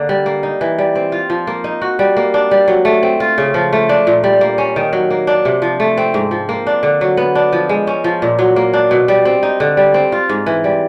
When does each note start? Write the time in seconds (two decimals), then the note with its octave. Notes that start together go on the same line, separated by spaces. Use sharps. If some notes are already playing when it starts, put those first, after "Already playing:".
Already playing: D3 A#3
0.09 G3
0.26 A#3
0.43 D#4
0.61 E3
0.78 G3
0.95 C4
1.12 F4
1.30 F3
1.47 A#3
1.64 D#4
1.82 F#4
1.99 G3
2.17 A#3
2.34 D4
2.51 G3
2.68 F#3
2.85 A3
3.03 C4
3.20 F4
3.38 C#3
3.54 F3
3.73 A3
3.89 D4
4.07 A#2
4.24 G3
4.41 A#3
4.58 C#4
4.76 D#3
4.93 F#3
5.10 A#3
5.27 D4
5.45 C3
5.62 F3
5.80 A3
5.97 C4
6.14 G#2
6.31 F3
6.49 A#3
6.67 D4
6.83 D3
7.01 F#3
7.17 B3
7.35 D4
7.52 F3
7.69 G#3
7.87 C#4
8.04 F3
8.22 A#2
8.39 F#3
8.56 A#3
8.73 D4
8.91 B2
9.08 G3
9.25 C4
9.43 D#4
9.60 D3
9.77 G3
9.94 C4
10.12 F4
10.29 G#2
10.46 E3
10.64 G3